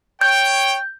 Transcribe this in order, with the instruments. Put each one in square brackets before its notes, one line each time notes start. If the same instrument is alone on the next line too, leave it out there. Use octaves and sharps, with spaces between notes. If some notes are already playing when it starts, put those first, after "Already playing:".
[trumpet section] C#5 G5 [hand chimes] G6